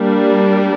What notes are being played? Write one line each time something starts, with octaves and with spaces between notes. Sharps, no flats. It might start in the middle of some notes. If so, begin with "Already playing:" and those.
Already playing: G3 A#3 D4